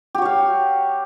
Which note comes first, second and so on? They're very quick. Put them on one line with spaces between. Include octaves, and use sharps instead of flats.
G4 F#4 C#5 F5